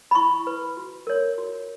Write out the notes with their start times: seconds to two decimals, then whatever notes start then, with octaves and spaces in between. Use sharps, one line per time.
0.11 B5
0.15 E4 C#6
0.47 B4
0.77 F#4
1.07 A#4 C#5
1.38 F#4